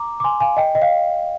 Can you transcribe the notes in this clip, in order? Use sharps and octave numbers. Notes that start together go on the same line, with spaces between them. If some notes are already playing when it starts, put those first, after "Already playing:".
Already playing: A#5 D6
D6
G#5 C6
F5 G#5
D#5 G5
D#5
F5